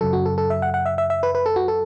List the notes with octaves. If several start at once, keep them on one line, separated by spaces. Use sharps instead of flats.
F#2 C#3 F#3 A4
F#4
A4
A4
E5
F#5
F#5
E5
E5
E5
B4
B4
A4
F#4
A4